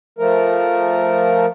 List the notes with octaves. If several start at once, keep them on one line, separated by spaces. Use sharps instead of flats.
F3 A3 A#4